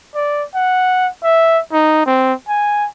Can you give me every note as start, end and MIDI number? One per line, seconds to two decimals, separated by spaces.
0.15 0.44 74
0.55 1.08 78
1.23 1.60 76
1.72 2.05 63
2.06 2.33 60
2.48 2.87 80